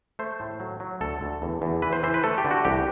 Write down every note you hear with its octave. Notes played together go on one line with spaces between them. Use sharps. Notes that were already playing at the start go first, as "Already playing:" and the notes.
A3 C5
A2
F#3
F#3
D2 A4
D2
E2
E2
E3 B4
C5
E3 C5
B4
A3 A4
G4
D3
F#4
C2 G4